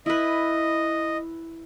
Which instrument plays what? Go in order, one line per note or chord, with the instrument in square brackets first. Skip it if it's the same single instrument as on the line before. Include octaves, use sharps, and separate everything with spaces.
[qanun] E4 B4 [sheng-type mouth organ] D#5